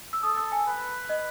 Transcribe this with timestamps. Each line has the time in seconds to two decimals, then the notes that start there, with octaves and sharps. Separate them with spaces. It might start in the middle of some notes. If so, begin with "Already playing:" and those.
0.13 E6
0.23 A4 D#6
0.37 E6
0.52 G#5
0.67 B4
1.09 D#5